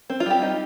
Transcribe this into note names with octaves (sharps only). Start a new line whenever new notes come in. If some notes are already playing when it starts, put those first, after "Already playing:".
C4
F4
G3 G4
D#4